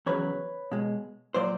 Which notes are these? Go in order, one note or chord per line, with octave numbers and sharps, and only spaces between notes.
E2 C#3 F#3 B4 C#5
B2 G#3
A#2 F#3 C5 D5